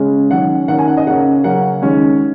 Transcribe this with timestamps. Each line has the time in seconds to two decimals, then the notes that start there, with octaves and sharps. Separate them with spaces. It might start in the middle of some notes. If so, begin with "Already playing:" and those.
Already playing: C#3 G#3 C#4
0.31 D#3 F#3 C#4 F#5
0.68 D#3 A#3 C#4 F#5
0.79 G#5
0.88 F#5
0.97 D#5
1.06 C#3 A#3 C#4 F#5
1.44 C#3 F#3 A#3 C#4 F#5
1.82 D#3 G#3 C#4